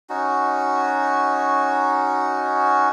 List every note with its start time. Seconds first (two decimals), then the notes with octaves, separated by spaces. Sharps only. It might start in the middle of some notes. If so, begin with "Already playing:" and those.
0.10 C#4 D#4 F#4